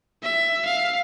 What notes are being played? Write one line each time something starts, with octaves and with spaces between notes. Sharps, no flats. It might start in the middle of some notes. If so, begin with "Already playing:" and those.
E5
F5